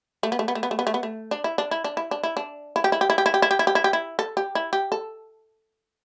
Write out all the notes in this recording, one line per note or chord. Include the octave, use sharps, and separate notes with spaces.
A3
B3
A3
B3
A3
B3
A3
B3
A3
B3
A3
D4
E4
D4
E4
D4
E4
D4
E4
D4
E4
G4
E4
G4
E4
G4
E4
G4
E4
G4
E4
G4
E4
G4
E4
A4
G4
E4
G4
A4